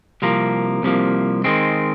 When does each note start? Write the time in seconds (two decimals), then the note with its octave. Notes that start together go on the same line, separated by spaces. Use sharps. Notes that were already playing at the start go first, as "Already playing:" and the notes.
0.22 C2 C3 F3 A#3
0.83 C2 C3 F3 A#3
1.44 D#3 G#3 C4